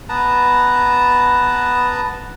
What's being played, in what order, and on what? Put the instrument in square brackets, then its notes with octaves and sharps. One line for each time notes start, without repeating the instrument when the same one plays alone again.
[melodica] B3 B4 A5 A#5